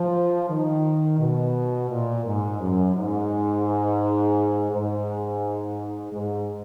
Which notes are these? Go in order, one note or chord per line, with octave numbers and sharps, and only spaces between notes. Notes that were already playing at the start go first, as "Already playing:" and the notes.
Already playing: F3
D#3
B2
A#2
G#2
F#2
G#2
G#2
G#2